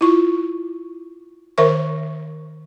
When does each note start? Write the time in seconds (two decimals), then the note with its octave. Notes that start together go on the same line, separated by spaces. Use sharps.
0.01 E4 F4 C#6
1.58 D#3 A#4 C5 E5 C#6